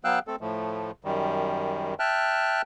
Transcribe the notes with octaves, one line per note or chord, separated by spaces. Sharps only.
F#3 B3 F5 G5 E6 F#6
A3 C4 A4
A2 F3 A3
F#2 D#3 G3
E5 G5 A5 F6 F#6